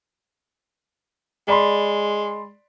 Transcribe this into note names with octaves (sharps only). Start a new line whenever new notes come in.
G#3 D5 B5 C6